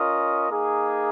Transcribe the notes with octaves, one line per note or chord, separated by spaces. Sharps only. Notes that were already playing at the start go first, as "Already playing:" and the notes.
Already playing: C#4 F4 A#4 D#5
A#3 D#4 G#4